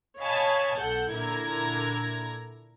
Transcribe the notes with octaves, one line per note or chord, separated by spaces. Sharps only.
C#5 D#5 F5 G#5 A5 B5
B1 A4 F#5 G6
A#2 D3 E4 A#4 A#5 G#6